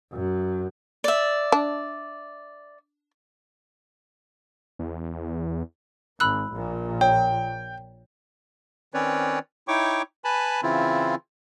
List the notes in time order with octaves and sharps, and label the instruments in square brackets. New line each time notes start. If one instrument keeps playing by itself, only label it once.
[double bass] F#2
[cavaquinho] D5 E5
[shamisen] D4
[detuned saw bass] E2
[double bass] G#1 [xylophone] B5 E6 F#6
[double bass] A#1 A#2
[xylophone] C#5 [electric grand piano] G5
[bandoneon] D#3 C4 C#4 B4 C#5 D5
D#4 E4 C#5 G5 C#6 D6
B4 G#5 A5 B5
C#3 E3 C4 E4 F4